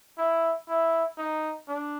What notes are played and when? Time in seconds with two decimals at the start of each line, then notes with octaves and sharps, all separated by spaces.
0.17 E4
0.68 E4
1.18 D#4
1.68 D4